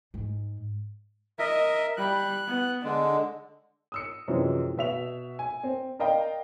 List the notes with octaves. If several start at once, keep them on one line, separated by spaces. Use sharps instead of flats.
G#2
A#4 D#5 E5
G3 B5 F#6
B3
D3 G#3 D4
D#6 E6 C#7
F#2 C3 E3 F3 G#3
B2 E5 F7
G#5
C4
A#4 D5 D#5 F5 G5 A#5